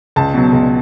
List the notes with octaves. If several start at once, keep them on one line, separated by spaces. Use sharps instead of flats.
C#2 A5
B2 F#3
C#2